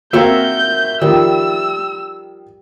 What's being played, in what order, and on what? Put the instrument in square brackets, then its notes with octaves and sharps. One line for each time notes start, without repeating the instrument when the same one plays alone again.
[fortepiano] A#3 C4 F5 [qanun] F#4 A#4 C#5 [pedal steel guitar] E5 [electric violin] G6
[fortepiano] D#3 F3 [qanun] G3 [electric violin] E6